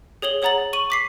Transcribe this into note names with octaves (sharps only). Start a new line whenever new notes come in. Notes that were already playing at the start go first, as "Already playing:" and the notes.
G#4 C#5 F#7 G7
G#4 C#5 F#5 A#5 A6 F#7
C#6 D#7 F#7
D6 B6 C7